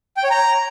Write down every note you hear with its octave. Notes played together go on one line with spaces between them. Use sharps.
G5
C#5
A#5